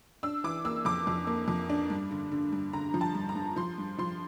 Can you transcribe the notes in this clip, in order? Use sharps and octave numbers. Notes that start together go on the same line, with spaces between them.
D4 E6
E3 D6
A#3 E6
F2 D6
F2
A#3
F2
D4
G2
D3
D3
G2
D3 A#5
F3
A5
G2
A#5
G2
F3 C6
G2
F3 C6